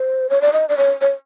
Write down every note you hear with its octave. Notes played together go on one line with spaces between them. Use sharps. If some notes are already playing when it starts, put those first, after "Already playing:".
Already playing: C5
C#5
D5
D#5
D5
C#5
C#5